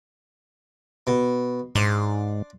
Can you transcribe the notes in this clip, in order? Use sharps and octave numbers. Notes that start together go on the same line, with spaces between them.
B2
G#2 D4 C6